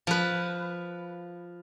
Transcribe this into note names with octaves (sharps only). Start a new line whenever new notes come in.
F3 B4